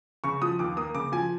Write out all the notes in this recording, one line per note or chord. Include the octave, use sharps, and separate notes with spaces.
C#3 C#6
F3 D#6
D#2 D6
A#3 D#6
C#3 D6
F3 G#5